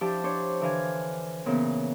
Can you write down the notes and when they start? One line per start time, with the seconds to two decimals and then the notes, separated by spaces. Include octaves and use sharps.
0.01 F3 D4 E4 G4 A5
0.23 D4 C5 C#5
0.61 D3 E3 F5 G#5
1.46 A#2 C#3 E3 B3